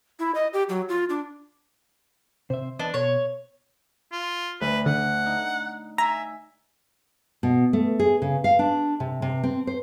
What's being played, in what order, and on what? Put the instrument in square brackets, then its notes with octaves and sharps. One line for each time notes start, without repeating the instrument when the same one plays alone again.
[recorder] E4
D#5
G4
F#3
F4
D4
[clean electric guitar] C3 E5 [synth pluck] C5
[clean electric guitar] E2 B4 D#5 [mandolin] D4
[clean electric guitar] B2 [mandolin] C#5
[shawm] F4
[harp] D2 [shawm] B4
[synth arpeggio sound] D3 [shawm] F#5
[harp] D#4
[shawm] E5 [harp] G#5 [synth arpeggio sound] A#5
[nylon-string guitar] B2
A3
G#4
C#3
F5
D4
C3
C3
C4
C5